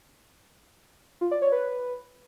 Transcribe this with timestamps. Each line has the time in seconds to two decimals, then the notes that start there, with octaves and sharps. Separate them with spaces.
1.21 F4
1.31 D5
1.42 C#5
1.52 B4